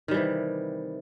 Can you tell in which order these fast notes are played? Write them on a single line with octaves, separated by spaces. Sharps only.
D#3 G3 E3 C3